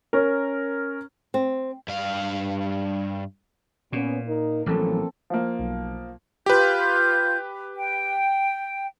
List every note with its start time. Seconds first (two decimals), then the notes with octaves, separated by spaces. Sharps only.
0.13 C#4 A#4
1.34 C4
1.88 G2 F5
3.93 A#2 B3 C#4
4.27 D#4 A#4
4.66 A1 F3 F#3 A#3 C4 A4
5.30 F3 A#3
5.59 B1
6.46 F4 G4 B4 G6
7.77 G5